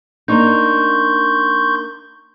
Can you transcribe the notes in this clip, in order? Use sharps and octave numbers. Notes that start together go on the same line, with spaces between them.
A#3 D4 D#4 C6 C#6 G6